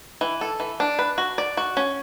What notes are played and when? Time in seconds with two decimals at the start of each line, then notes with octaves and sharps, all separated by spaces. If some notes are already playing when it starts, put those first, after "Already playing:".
0.21 E3
0.41 A4
0.60 E3
0.80 D4
0.99 B4
1.18 F#4
1.38 D5
1.57 F#4
1.77 C#4